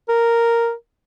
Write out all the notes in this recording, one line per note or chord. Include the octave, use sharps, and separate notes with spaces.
A#4